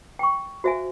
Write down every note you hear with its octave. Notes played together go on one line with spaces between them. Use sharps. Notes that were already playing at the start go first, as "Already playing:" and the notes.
G5 C#6
F#4 C5 E5 F5 G#5